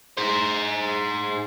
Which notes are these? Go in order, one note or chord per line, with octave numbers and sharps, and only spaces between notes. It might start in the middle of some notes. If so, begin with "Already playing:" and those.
G#4 C5